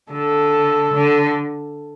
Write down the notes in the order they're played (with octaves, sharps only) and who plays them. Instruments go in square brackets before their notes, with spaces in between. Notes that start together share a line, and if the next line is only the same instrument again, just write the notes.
[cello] D3 [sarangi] A4
[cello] D3